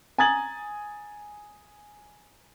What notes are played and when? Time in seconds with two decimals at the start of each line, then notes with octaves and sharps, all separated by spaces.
0.18 G#5 A#5 D#6 G#6 A6 F#7